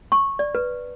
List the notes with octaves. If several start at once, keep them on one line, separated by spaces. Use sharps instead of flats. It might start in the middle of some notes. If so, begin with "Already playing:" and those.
C#6
D5
B4